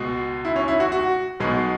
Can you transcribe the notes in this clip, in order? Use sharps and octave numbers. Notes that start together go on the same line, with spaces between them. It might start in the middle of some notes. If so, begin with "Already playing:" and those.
Already playing: C#2 B2 G#3
E4
C#4
E4
F#4
F#4
B1 B2 G#3